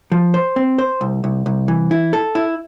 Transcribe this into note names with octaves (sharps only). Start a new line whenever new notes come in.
F3
C5
C4
C5
C2
C2
C2
E3
E4
A4
E4